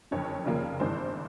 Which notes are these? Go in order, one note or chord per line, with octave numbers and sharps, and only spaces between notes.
F#1 F2 D3 C#5
F1 D#2 C#3 F3 A#3
G#1 G2 E3 G#3 C5